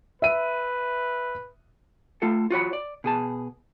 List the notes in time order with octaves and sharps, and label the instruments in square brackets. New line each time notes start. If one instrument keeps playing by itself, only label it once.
[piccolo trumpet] B4 [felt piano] E5 D#7
[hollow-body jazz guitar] A3 F4 A4
F4 F#4 C#5 B5
D5
B2 G#4 A5